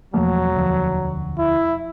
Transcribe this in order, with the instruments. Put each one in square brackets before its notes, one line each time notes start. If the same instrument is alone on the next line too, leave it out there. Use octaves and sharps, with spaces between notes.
[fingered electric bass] E1 A3 A#3 [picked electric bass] F3 [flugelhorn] F#3
[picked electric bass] D2 F3
[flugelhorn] E4